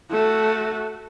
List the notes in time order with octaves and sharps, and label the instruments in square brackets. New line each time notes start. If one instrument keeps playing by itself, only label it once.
[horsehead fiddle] A3 F#4